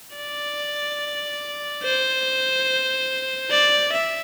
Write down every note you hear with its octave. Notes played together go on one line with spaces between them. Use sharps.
D5
C5
D5
E5